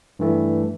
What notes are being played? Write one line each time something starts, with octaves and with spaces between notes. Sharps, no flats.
G2 E3 A3